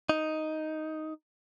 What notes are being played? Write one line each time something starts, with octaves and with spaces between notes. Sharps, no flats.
D#4